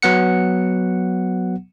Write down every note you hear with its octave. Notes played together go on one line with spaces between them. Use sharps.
F#3 B3 F#5 C#7